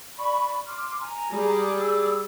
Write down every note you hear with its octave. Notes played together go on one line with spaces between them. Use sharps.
D5 B5 C#6
C6 D6 F6
G#5 A#5
G3 G#4 D5
E6